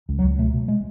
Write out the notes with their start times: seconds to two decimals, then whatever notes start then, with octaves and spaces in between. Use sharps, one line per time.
0.09 C#2
0.19 F#3
0.24 C#2
0.38 B2 A3
0.54 B2
0.68 G#3